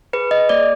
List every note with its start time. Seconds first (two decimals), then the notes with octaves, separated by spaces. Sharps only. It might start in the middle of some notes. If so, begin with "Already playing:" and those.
0.13 G#4 B4
0.31 D#5
0.49 A#3 D5